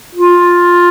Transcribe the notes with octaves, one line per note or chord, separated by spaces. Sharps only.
F4